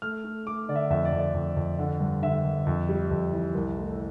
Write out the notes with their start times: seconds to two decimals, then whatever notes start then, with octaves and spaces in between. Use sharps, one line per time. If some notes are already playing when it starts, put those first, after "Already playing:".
0.02 A3 F6
0.24 A3
0.46 A3 D6
0.69 D3 D5
0.76 E5
0.90 F2 E5
1.05 D5
1.12 F2
1.19 D5
1.34 F2
1.56 F2
1.79 D3
2.00 G2
2.22 D3 E5
2.45 G2
2.67 F2
2.89 G3
3.11 F2
3.33 E3
3.55 C2
3.77 A3